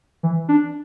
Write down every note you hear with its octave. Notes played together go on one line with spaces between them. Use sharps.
E3
D4